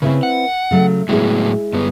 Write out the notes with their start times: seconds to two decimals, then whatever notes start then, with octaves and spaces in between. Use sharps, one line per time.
0.02 C#3 C4 E4 B4
0.23 F#5
0.71 C#3 F#3 A3
1.09 A2 F#3 G#3 B3 E4 G#4
1.73 G2 B3